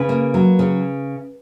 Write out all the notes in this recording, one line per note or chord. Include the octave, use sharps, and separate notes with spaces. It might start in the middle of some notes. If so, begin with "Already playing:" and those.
Already playing: C#3 B4
A#3
F#3
C#3